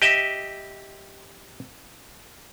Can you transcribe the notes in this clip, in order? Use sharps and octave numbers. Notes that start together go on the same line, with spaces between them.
G4 D#5 E5